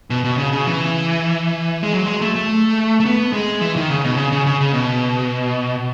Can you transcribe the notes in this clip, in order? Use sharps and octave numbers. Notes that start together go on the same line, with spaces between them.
B2
B2
C#3
C#3
E3
G#3
F#3
G#3
A3
A3
A3
B3
G#3
E3
D#3
C#3
B2
C#3
C#3
C#3
C#3
B2